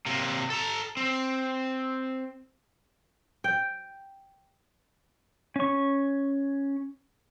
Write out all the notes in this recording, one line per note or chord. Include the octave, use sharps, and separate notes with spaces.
C3 A#3
A4 A#5
C4
G5
C#4 C#6